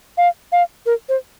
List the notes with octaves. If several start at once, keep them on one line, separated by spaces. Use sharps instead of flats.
F5
F5
A#4
C5